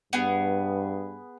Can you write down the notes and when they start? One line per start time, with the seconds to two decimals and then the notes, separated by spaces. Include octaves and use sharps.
0.13 G2 B3 G#4